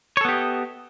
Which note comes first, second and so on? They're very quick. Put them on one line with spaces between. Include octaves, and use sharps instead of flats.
C#5 A4 B3 G4 D#5